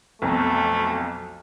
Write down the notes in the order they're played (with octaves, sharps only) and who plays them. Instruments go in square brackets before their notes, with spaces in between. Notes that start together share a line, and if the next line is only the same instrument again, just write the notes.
[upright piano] B1 F2 F#3 [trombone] A3